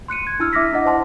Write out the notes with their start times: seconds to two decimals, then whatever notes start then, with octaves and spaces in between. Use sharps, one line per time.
0.08 C6 F#6 C#7 D#7
0.27 G#6
0.40 D4 E4 E6 F6
0.53 E5 D6 F6 A#6 B6
0.72 D4 E4 D#5 F#5
0.86 C5 A5 C6